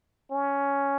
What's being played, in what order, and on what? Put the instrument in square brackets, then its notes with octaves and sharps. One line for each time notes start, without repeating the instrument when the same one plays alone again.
[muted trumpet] C#4